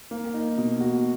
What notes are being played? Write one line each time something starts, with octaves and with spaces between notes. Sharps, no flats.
A#3
D#4
B2
F#4